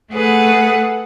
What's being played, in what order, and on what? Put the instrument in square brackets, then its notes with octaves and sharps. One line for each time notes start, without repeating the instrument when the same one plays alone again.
[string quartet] A3 G#4 A4 B4 F#5